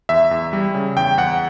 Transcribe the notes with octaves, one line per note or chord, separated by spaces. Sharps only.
E2 E5
E2
G3
C#3
E2 G5
E2 F#5